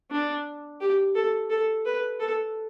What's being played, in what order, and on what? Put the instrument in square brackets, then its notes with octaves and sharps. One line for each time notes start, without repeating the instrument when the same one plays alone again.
[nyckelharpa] D4
G4
A4
A4
B4
A4